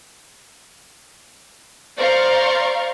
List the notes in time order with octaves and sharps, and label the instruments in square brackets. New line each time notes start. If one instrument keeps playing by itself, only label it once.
[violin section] C5 D5 F5 A#5 C6 C#6